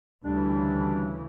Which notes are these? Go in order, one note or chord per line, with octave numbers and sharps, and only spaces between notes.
D2 C#3 E3 G3 D4